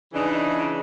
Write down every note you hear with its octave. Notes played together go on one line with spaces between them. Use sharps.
C#3 E3 D4 D#4